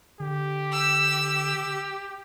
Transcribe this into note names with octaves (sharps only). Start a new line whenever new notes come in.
D3 G4
E6